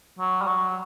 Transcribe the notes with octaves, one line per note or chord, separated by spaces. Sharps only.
F#3
G3
F#3